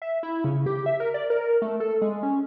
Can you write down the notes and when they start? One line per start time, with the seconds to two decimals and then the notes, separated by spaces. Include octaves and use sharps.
0.02 E5
0.23 E4
0.44 C#3
0.66 G4
0.86 E5
1.00 A#4
1.14 D5
1.30 A#4
1.62 A3
1.80 A4
2.02 G#3
2.23 C#4